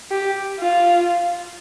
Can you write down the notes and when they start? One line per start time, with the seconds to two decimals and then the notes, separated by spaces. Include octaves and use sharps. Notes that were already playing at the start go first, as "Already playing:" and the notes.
0.11 G4
0.60 F4